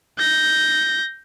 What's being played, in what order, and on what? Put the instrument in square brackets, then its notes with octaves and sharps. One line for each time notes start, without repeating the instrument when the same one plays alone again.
[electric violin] G6 A#6